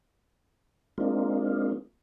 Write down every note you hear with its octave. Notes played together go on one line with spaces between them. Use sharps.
G#3 A#3 C4 D4 D#4 F4